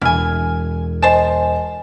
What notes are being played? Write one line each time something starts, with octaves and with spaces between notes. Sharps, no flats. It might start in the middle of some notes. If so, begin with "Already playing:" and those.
E1 E4 G#5 F6
C5 D#5 G#5 A5